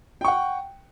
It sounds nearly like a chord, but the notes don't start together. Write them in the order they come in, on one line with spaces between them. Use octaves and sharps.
G5 C#6 F#5